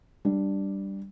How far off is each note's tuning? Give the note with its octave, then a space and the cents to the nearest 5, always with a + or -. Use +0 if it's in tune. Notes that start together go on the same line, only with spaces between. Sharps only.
G3 +0 D4 +0